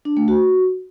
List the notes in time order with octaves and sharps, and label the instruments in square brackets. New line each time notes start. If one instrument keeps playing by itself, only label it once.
[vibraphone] D4
A3
F#4